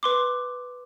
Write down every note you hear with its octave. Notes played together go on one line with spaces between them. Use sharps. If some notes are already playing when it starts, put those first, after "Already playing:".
B4 C6 D6